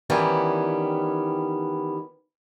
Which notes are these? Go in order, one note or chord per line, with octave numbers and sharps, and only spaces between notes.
D#3 E3 G3 B3 C#4